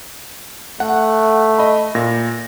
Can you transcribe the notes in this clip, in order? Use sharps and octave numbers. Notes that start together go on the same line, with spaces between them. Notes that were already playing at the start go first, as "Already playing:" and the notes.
A3 F#5
D#5 B5
A#2 A#6